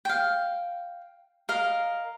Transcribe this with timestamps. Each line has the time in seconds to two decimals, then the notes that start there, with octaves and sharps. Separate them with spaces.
0.05 F5 G5
1.49 A#4 D#5 F5